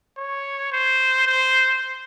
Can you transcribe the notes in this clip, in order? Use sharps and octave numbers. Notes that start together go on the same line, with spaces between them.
C#5
C5
C5